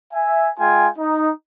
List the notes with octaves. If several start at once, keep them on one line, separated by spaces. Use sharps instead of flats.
E5 G#5
G#3 F4 G5 G#5
D#4